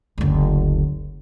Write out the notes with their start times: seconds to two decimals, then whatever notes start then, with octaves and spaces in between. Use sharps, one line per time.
0.18 F#1 D2